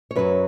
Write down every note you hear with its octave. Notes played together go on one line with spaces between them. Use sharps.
C#5
F#2 F#3 B4